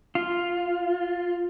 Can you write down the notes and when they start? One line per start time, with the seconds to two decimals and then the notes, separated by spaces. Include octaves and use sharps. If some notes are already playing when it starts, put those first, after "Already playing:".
0.15 F4